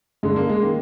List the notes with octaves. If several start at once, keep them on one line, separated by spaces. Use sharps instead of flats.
G2 D3 G#3
A#3
G#3
D#3 A#3